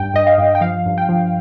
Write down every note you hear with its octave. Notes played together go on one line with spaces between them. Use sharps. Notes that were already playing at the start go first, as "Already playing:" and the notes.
Already playing: G2 G5
G2 D#5
F5
G2
G5
F3 F5
G2
G5
F3